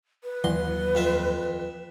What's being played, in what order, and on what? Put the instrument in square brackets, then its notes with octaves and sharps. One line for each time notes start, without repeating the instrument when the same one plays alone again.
[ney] B4
[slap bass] D#2 F#3 [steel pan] E3 [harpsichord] C6
[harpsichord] F2 F4 E5